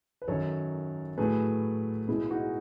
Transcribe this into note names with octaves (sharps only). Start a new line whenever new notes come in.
B4
F#2 D#3 F#3 A4 C#5
A2 F#3 A3 G#4 B4
B2 G#3 E4 G#4
D#4 F#4
G#4